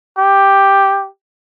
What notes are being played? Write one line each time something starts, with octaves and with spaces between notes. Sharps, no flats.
G4